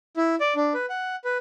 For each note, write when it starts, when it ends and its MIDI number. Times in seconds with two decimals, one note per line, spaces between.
0.17 0.36 64
0.41 0.54 74
0.56 0.73 62
0.74 0.86 71
0.90 1.16 78
1.25 1.38 71